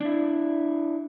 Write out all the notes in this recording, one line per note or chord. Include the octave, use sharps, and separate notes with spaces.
D4 E4